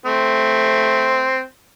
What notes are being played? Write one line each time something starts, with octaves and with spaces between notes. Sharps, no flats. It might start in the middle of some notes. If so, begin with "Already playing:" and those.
A3 C4